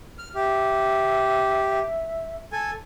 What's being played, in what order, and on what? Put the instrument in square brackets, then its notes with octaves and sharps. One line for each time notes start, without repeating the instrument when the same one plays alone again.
[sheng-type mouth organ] F6
[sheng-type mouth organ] G4 [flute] E5
[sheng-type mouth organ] A4 G#5